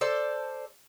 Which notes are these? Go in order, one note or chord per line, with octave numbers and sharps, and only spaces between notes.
A4 C5 D5 A5